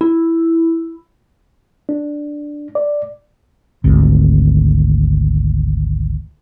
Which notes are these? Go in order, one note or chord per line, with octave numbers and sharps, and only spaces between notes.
E4
D4
D5
G#1 D2